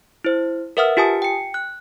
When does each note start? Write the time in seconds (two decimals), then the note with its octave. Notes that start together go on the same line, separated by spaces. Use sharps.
0.24 E4 C5
0.77 A#4 B4 E5 F#5 D#6 F6
0.97 F4 G4 G#5 A5 D#6
1.22 G5 C#7
1.54 F#6